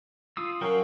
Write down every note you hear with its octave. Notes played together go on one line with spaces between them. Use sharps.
F4 D#6 E6
F#3 C#4 F#4 A#4 F5 G5